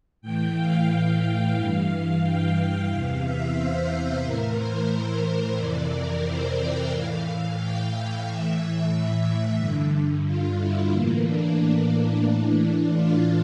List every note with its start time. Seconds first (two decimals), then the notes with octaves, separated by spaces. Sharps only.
0.21 A2 E3 G5
0.56 F5
0.88 F5
1.56 G2 E3
2.22 G5
2.89 E2 C3 E3 F5
3.23 E5
3.56 C5
4.23 A2 E3 A#4
4.56 C5
5.57 F2 C3 E3 D5
5.90 A#4
6.23 C5
6.57 G5
6.90 A2 E3 F5
7.23 F5
7.57 G5
7.91 F5
8.24 A2 E3 E5
9.57 G2 D3
10.25 F4
10.58 E4
10.91 A2 E3 A#3
11.25 D4
11.58 D4
12.25 A2 E3
12.92 F4